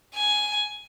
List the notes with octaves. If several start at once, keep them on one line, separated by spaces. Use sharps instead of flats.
G#5